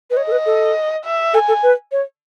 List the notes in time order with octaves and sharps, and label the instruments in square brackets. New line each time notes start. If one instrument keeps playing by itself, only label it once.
[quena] B4
[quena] C#5 [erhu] D#5
[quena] A4
B4
A4
[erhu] E5
[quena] A4 [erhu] G#5
[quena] A4
B4
C#5